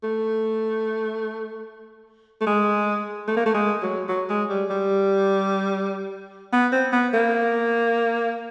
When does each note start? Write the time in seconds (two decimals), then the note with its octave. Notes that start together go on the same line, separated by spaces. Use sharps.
0.04 A3
2.41 A3
2.47 G#3
3.28 A3
3.37 A#3
3.46 A3
3.54 G#3
3.83 F#3
4.09 F#3
4.30 G#3
4.50 G3
4.70 G3
6.53 B3
6.72 C4
6.93 B3
7.14 A#3